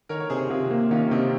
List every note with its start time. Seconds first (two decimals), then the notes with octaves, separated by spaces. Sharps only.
0.09 D#3 A#4 C#5
0.20 C#5
0.30 C3 G#4 C5
0.50 C3 F4 G#4
0.71 A#3
0.91 D#3 C#4 F4
1.11 C3 C4 D#4